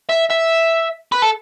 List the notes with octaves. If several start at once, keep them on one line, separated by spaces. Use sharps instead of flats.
E5
E5
B4
A4